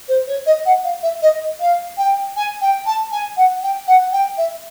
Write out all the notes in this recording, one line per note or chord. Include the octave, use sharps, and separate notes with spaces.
C5
C#5
D#5
F#5
F5
E5
D#5
F5
G5
G#5
G5
A5
G#5
F#5
G5
F#5
G5
E5